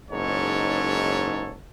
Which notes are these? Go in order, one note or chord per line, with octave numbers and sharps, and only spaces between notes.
F#1 G#2 D#4 A4 C#5